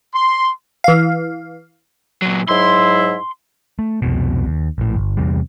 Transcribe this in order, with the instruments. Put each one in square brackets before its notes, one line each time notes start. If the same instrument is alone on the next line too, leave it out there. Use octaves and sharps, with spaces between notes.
[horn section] C6
[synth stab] E3 F5
[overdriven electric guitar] A#2 F#3
[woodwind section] G#2 F#3 E4 [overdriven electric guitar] C6
[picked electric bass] A3
C2 F2 B2
D#2
A#1 A2
G1
E2 C3 G3